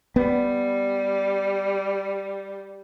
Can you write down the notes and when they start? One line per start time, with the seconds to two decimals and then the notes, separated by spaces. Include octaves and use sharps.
0.16 G3 B3